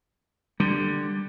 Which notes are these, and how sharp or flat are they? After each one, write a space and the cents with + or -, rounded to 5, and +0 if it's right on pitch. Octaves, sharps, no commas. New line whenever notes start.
D3 +15 G3 +0